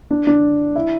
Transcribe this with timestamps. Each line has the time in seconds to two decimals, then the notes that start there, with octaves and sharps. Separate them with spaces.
0.11 D4
0.27 D4
0.76 E4